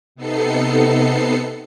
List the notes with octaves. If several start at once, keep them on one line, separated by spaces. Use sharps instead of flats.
C3 B3 D#4 A4 C7 C#7